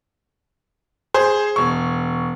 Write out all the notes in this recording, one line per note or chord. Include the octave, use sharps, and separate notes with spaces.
G#4 C5
E1 C#6